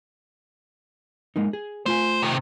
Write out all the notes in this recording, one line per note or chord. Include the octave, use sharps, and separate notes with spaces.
G#3 A#3 D#4
G#4
A3 F4 C5 G#5
C3 D#3